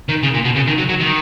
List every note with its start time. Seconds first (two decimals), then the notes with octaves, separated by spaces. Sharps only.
0.09 D#3
0.23 C#3
0.34 A#2
0.44 B2
0.56 C#3
0.67 D#3
0.78 F#3
0.89 F#3
1.00 D#3